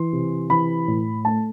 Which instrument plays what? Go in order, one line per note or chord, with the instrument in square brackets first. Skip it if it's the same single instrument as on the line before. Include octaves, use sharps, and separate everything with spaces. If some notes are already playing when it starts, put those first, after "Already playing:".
Already playing: [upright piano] E3 C6
C3
E3 B5
A2
A3 A5